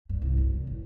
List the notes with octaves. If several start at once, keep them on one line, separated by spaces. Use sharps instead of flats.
G2
C2
F#2
D3
A1